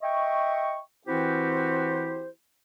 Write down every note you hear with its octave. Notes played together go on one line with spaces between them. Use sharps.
D#5 E5 G5 C#6
E3 C4 E4 F#4 G4 C5